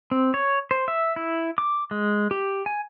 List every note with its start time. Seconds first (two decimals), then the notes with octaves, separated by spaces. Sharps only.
0.11 C4
0.34 C#5
0.71 C5
0.88 E5
1.16 E4
1.58 D6
1.91 G#3
2.31 G4
2.66 G#5